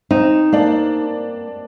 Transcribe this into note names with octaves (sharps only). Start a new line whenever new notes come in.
C4 D#4
A#3 D4